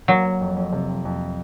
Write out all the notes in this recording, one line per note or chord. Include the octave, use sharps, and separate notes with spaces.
F#3 A#3
A#3
F2
F2
C3
F2
F2